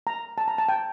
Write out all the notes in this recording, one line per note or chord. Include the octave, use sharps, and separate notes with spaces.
A#5
A5
A#5
A5
G5